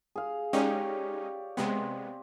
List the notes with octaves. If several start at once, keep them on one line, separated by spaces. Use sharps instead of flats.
G#4 F5
G#3 C#4 D#4 G4 C#5 D5
C3 G#3 B3 C4